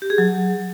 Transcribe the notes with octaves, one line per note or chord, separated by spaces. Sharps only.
G4
G#4
F#3